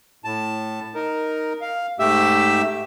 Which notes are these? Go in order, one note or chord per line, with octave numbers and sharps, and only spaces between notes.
A2 A5
D#4 A#4
F5
G#2 A3 G4 E5 E6